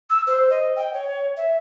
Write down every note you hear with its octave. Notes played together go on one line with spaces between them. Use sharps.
E6
C5
D#5
G5
C#5
E5